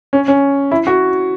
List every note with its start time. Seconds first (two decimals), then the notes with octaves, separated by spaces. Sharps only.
0.13 C#4
0.28 C#4
0.71 E4
0.87 F#4